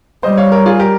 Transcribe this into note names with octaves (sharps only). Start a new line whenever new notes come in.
G3 C5 D#5
C#5 F5
A#4 C#5
F4 G#4
G4 A#4